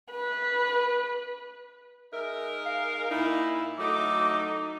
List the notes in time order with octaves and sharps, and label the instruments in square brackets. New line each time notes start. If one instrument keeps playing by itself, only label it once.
[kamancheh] B4
[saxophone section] G#3 D#4 A#4 [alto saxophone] E5
[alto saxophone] F5
[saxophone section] A#2 A#3 D#4 [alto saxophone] E4
[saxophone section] F#3 A3 [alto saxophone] D#4 [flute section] D6